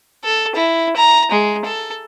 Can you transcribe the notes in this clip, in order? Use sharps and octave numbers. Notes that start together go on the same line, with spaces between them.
A4
E4
A#5
G#3
A4